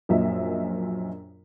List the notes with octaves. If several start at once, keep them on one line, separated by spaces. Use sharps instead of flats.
A#1 F#2 A#2 D#5 E5